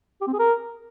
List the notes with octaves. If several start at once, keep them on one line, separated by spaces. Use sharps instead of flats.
G4
C4
G#4
A#4